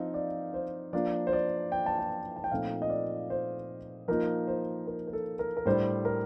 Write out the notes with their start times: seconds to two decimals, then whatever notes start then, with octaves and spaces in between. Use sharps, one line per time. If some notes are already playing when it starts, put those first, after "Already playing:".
Already playing: F3 C4 D#4 D#5 F5
0.14 D5
0.54 C5
0.93 F3 A#3 D4 D5
1.27 C5
1.33 D5
1.72 G5
1.86 A5
1.99 G5
2.36 A5
2.44 G5
2.51 A#2 F3 A3 C4 D#4 F5
2.82 D#5
2.90 D5
3.30 C5
4.08 F3 A#3 D#4 A#4
4.47 C5
4.87 A#4
5.08 A#4
5.13 A4
5.39 A#4
5.57 A#4
5.65 A2 G3 D4 C5
6.05 A#4